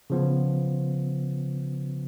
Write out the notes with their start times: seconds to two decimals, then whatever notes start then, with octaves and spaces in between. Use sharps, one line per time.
0.10 C#3 F3 B3